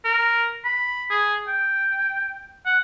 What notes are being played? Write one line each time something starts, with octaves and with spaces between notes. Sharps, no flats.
A#4
B5
G#4
G5
F#5